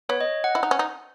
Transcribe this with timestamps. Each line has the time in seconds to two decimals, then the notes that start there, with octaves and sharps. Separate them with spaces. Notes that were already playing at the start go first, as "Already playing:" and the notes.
0.09 B3 C#5
0.21 D#5
0.44 F#5
0.55 E4
0.63 D#4
0.71 C#4
0.79 D#4